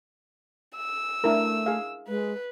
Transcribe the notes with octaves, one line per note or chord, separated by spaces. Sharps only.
E6
A3 D4 E4 A#4
G#4 F5
G#3 B4